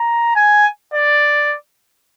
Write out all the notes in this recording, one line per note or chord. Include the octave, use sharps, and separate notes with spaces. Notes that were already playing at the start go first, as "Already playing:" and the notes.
Already playing: A#5
G#5
D5